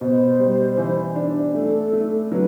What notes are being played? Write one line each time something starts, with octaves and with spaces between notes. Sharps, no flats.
B2 C5
G3
E3
D4
A3 A4
A3
F#3 B4